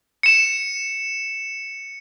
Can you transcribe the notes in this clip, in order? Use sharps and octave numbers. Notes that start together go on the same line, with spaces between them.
C#7 E7